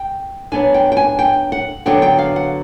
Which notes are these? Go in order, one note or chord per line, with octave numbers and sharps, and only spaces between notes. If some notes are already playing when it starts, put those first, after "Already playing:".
Already playing: G5
F#3 B3 D4 G#5
G5
G5
G#5
G5
F#5
D3 F#3 B3 D4 G5
G5
F5
F#5